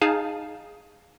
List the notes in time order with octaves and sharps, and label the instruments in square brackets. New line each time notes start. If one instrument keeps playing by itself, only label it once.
[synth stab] D#4 G#4 F5 G#5 A5